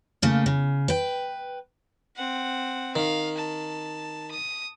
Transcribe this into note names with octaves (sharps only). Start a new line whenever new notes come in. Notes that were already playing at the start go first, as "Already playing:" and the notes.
C#3 A3 A#3
C#3
B4 G5
C4 F#5
D#3 F5
A5
D#6